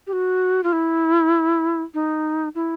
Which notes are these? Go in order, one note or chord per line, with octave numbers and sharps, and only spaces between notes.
G4
F#4
F4
E4
D#4
E4